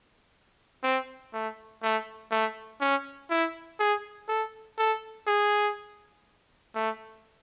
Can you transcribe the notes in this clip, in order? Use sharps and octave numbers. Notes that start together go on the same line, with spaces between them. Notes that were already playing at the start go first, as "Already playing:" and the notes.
C4
A3
A3
A3
C#4
E4
G#4
A4
A4
G#4
A3